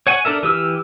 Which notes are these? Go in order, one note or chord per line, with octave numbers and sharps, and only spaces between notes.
C#5 F#5 G#5
D4 A4 A#4 E5
E3 G4 E6 F6